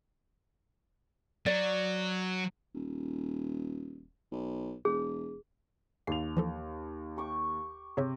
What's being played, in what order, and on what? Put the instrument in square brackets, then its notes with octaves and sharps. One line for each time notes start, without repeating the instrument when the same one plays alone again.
[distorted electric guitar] F#3 [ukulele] D5
[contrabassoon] D#1
B1
[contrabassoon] E1 [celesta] G#4
[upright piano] D#2 F7 [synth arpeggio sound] C7
[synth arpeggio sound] E3 F3 A4
[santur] G4 C#6 D6
[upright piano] C3 [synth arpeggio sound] G#4 C#5 E5